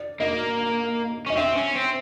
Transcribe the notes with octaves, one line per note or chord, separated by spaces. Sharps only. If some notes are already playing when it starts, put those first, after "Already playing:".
Already playing: D5
A#3 D#5
C#4 D#5
C4 E5
C#4
C4